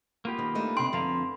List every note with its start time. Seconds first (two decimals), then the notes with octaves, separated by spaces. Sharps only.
0.25 A#3 B3 F4 G4 A#4
0.38 D#3 B4
0.55 A3 D4 D#4
0.77 C3 G5 C6
0.93 F2 D3 F5 A#5